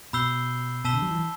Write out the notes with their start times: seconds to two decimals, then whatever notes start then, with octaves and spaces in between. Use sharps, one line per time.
0.13 B2 B5 E6 G6 C7 G7
0.84 B2 A5 E6 B6 E7 G7
0.93 D3
1.02 F#3
1.11 E3